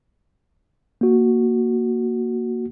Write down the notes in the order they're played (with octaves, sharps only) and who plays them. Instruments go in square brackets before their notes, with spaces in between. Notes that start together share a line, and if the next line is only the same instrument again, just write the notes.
[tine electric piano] A#3 F#4